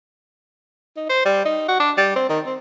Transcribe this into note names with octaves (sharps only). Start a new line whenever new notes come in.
D#4
C5
G3
D#4
F#4
D4
G3
C4
D#3
C4